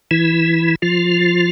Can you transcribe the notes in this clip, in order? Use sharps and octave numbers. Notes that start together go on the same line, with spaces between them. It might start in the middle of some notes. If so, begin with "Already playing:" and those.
E3 E4
F3 F4